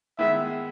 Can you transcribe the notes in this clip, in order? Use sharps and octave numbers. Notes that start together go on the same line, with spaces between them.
D#3 G#3 B3 E4 E5